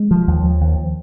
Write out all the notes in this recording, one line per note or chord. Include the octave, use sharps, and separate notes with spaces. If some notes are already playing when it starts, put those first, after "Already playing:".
Already playing: G#3
F3
D#2
F3
D#2